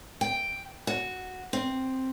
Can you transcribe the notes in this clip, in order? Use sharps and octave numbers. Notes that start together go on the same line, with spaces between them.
G5
F#4
C4